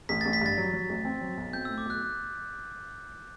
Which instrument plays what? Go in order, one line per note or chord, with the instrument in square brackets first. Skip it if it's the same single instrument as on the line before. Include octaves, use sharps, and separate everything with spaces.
[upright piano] A1 [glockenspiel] B6
[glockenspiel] A6
[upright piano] A1
[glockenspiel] B6
[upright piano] G2 [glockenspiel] A6
[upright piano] F#3
F#3
A1
C4
F#3
B1
[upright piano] C4 [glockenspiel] G6
[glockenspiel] E6
[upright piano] A2
[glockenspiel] D6
[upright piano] B1 [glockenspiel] F#6